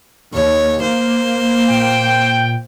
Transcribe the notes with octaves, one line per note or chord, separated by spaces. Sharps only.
D#2 C#5
A#3 C5
A#2 G5